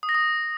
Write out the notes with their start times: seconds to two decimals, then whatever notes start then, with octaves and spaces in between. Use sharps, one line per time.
0.03 D#6
0.09 A#6
0.15 D#6